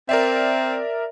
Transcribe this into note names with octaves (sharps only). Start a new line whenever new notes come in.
C4 A#4 D5 E5